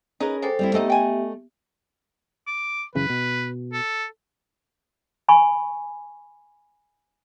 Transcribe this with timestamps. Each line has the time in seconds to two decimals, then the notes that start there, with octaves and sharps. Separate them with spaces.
0.20 C#4 D#4 G#4 A#4 B4
0.42 G#3 G4 A4 C5
0.59 G3 C4 E4
0.74 D3 A3 B3 C4 D#4 G4 D#5 E5
0.90 G5 G#5
2.47 D6
2.95 F#2 C#3 E3 B4
3.10 B2
3.73 A4
5.29 G#5 B5 C#6